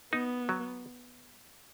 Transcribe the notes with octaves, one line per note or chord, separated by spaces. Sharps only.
B3 D#4
F#3